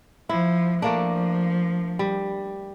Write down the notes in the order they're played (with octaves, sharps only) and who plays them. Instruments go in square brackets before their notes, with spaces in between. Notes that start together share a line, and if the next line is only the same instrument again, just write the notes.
[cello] F3 [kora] E4
[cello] F3 [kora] A3 A#3 D4
[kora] G3